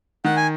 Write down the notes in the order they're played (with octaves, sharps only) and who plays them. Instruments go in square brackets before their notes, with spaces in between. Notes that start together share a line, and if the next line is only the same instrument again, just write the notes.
[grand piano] D#3 [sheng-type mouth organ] F#5
[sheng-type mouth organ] G#5